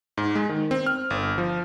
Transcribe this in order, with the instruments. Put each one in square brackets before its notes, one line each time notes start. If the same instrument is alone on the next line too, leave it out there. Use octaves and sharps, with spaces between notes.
[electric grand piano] G#2
G#3
D#3
C4
F6
G1
F3